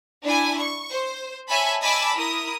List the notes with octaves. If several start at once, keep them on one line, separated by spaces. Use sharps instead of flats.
D4 E4 G#5
C#6
C5
C#5 E5 G#5 A5 B5
D#5 G#5 A5 B5 D6 E6
E4 A#4 D#6